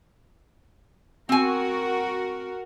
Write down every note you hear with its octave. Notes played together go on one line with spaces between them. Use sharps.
C4 F#4 A#4 G#5